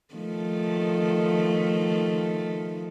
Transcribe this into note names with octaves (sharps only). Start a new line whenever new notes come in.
D#3 F3 A3